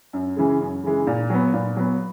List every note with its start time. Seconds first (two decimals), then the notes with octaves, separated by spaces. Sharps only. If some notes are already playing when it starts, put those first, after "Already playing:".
0.13 F#2
0.36 C#3 E3 G#3
0.60 F#2
0.84 C#3 E3 G#3
1.07 A#2
1.30 F#3 B3
1.53 A#2
1.76 F#3 B3